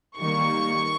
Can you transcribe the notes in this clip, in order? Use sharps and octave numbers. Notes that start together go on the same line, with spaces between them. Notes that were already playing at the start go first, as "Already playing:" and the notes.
D#3 G3 A#3 C#6